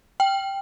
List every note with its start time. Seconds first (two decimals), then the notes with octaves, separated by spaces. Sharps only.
0.20 G5